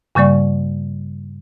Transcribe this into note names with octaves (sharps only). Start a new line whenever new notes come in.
G2 C#3 G3 A#3 D5 C#6